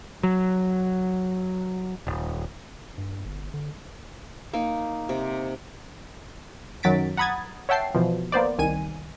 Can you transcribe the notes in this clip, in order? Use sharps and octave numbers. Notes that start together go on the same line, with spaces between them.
F#3
D#1
G2
G1
D3
A#3 D#4
C3
F#2 D#3 F#3 A6 B6 D7
F#5 A#5 B5 D#6 G#6 A6
C#5 E5 F#5 G5 A5 C7
B2 E3 F3
A#3 B3 C5 D5
C2 D#3 G#5 D#7